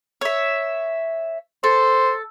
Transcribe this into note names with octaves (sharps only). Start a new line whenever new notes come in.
C#5 E5
A4 C5